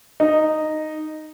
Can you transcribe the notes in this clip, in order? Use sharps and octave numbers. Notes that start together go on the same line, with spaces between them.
D#4